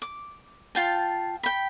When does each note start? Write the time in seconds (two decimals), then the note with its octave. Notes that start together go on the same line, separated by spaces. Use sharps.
0.02 D6
0.75 F4 G5 A5
1.43 G5 B5